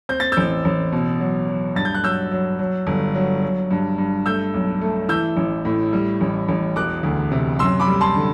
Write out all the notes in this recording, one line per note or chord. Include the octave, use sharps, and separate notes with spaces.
C4 G6
A6
A1 E6 G6
A1
B2
F#3
F#3
G2 A6
G6
F#6
F#3 E6 G6
F#3
F#3
G1
F#3
F#3
G2
G2
A3 E6 G6
B1
A3
E3 E6 G6
A1
A2
G3
A1
A1
E1 D6 F#6
D2
C3
F#2 C6 E6
B5 D6
G3
A5 C6
D3